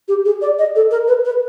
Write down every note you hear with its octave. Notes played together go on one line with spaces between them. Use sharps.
G4
G#4
D5
D#5
A4
A#4
B4
B4